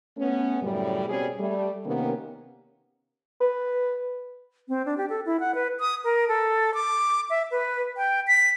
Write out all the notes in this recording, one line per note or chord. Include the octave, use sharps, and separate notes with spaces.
A3 B3 C#4
F#2 A2 C#3 G3
B2 G3 C4 C#4 G#4
G3 A3
C3 D#3 A#3 B3 C#4 G4
B4
C4
D4
G4
A4
E4
F#5
B4
D#6
A#4
A4
D6
E5
B4
G5
B6